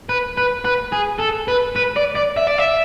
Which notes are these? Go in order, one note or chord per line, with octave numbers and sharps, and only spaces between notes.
B4
B4
B4
G#4
A4
B4
B4
D5
D5
E5
D5
E5